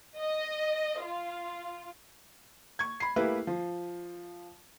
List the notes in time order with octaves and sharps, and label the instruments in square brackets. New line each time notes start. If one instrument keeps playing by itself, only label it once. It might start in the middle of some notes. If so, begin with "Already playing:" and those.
[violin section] D#5
F4
[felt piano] C#6 G#6
B5 C7
A3 A#3 E4 G4 B4
F3